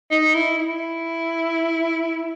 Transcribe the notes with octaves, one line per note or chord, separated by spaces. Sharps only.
D#4
E4
E4